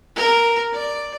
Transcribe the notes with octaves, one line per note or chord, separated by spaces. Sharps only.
A#4
D5